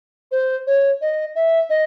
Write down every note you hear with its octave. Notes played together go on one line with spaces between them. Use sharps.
C5
C#5
D#5
E5
D#5